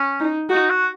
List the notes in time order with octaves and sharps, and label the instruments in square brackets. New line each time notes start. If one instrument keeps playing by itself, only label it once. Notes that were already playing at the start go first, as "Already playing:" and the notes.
Already playing: [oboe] C#4
[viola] D#4
[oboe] D#4 [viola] F#4
[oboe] F#4